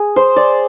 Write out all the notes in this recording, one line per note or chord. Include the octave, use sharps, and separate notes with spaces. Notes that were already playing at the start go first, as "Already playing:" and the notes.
Already playing: G#4
C5
D5